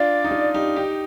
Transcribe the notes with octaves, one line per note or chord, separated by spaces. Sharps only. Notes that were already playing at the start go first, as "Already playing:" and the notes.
Already playing: D4 F4 D5
D#4
D4 F4
D#4 G4
D#4 G4 G5